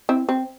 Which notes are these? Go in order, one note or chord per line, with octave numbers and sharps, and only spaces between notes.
C4 E4
C4